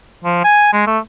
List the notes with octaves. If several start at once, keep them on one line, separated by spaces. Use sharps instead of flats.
F3
G#5
G#3
A3